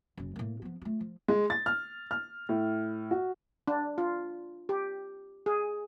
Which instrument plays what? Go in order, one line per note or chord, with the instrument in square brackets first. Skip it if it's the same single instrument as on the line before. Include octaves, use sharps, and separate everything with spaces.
[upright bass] F#1 C#3
A2 A#3
F3 B3
A3 F4
F3
[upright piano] G#3
A6
F6
F6
A2
F#4
[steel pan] D4
F4
G4
G#4